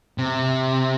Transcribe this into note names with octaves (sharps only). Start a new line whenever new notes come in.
C3